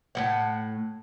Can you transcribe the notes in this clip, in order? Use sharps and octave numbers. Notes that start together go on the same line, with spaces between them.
A2 G#3 F#5